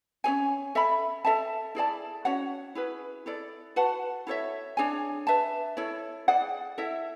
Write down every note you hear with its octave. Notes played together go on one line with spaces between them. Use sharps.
C#4 G#4 C#5 G#5
A4 E5 B5
A4 E5 A5
E4 G#4 D5 A5
C#4 F#4 C#5 F#5
E4 G#4 B4
E4 A4 D5
F#4 B4 F#5 A5
E4 A4 C#5 E5
D4 G#4 C#5 G#5
B4 E5 A5
E4 A4 C#5
G#4 D5 F#5
E4 A4 E5